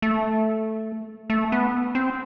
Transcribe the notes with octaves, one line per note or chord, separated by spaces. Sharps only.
A3
A3
B3
C4